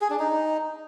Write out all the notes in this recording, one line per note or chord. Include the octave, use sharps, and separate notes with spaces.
G#4
D4
D#4